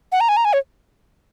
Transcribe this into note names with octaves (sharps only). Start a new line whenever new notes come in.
F#5
A#5
G#5
A#5
G#5
C#5